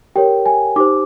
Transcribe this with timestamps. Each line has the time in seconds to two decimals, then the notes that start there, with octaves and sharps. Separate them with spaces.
0.16 G4 A#4 C#5 G5
0.46 G#5
0.76 D#4 G4 C5 D6